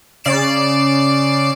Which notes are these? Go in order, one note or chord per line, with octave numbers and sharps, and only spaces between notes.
C#3 D5 C7 D7 E7